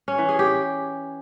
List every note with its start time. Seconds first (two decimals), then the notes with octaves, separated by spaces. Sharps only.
0.08 C#4
0.18 E3
0.29 G#4
0.39 G4